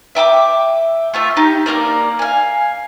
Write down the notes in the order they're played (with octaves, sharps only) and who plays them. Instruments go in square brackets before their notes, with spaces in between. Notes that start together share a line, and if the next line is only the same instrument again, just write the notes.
[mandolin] E5 G5 A5 D6
A3 F4 E5
D#4 G4
A#3 D4 A#4 D5
F5 G#5